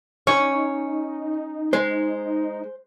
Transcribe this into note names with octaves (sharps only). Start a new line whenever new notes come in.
C#4 D#4 C#5
G#3 C5